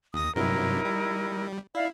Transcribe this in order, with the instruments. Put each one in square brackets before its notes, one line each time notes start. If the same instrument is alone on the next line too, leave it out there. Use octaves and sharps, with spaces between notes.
[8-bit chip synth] D#2 A#6 [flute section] D#6
[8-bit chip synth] G2 C3 F#3 [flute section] D#4 E4 A#4
[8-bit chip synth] G3
[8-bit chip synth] E4 [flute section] D5 E5 F5